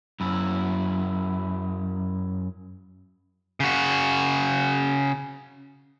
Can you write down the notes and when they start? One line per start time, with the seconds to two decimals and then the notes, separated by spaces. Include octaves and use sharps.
0.21 F#2 E4
3.60 C#3 F#4